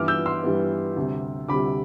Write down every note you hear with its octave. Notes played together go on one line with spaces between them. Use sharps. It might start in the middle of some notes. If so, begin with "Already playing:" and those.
Already playing: G2 E3 G3 B3 D6 F6
E6 G6
C6 E6
G2 E3 G3 B3
D2 C3 G3
D2 C3 G3 B5 D6